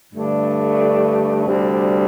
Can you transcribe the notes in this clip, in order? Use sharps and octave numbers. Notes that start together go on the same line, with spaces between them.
G2 D3 A3 D4
D2 C3 G3